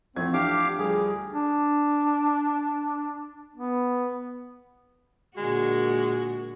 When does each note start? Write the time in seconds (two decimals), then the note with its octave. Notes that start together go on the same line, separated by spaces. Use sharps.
0.16 A1 F2 A3 C4 G#6
0.33 D4 G4 F5 D6
0.79 D2 F3 G3 G#4 A4
1.34 D4
3.56 B3
5.37 A#2 D3 G#3 F#4